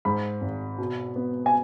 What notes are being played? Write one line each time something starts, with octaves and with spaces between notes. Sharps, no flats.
G#2 B5
G#1
B2
B3
G#5